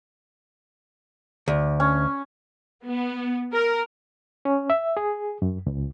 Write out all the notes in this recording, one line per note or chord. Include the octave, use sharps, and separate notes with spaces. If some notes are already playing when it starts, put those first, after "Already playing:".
D2
C#4
B3
A#4
C#4
E5
G#4
F#2
C#2